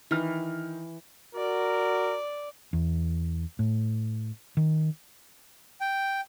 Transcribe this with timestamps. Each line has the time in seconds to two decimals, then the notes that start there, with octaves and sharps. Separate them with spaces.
0.11 D#3 E3 F6
1.35 F#4 A#4 D5
2.73 E2
3.59 A2
4.57 D#3
5.81 G5